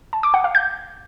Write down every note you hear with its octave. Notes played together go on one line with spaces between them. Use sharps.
A5
D6
F#5
F5
G6